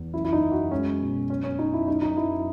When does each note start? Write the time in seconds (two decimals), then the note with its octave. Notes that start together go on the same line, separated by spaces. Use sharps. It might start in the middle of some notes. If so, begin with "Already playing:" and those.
Already playing: E2
0.13 F#2 E4
0.25 E4
0.33 D#4
0.42 F#2
0.52 F#4
0.71 G#3 C#4
1.01 B2
1.30 F#2 C#4
1.44 C#4
1.59 F#2 D#4
1.73 E4
1.88 F#2 D#4
2.02 D#4
2.16 F#2 E4